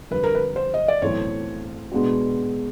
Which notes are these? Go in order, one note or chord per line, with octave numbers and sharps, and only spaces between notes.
F2 D3 G3 B4
A#4
B4
C5
D#5
D5
B1 A2 E3 A3 C4 C#5
B2 G#3 B3 D4 F#4